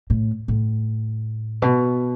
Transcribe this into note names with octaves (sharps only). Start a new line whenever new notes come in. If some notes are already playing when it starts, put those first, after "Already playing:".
A2
A2
B2